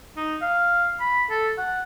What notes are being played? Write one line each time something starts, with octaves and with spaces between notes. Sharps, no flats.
D#4
F5
B5
A4
F#5